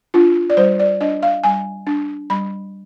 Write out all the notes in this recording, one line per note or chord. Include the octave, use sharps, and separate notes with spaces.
D4 F4
D5
G3 C5
D5
D4 D#5
F5
G3 G#5
D4
G3 B5